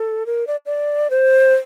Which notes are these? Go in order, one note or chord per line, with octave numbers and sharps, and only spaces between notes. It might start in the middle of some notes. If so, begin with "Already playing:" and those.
Already playing: A4
A#4
D5
D5
C5